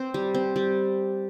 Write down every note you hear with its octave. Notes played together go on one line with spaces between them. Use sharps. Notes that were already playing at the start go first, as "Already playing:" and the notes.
Already playing: C4
G3
C4
G3